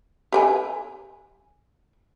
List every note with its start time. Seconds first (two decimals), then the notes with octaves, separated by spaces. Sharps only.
0.32 G4 G5 G#5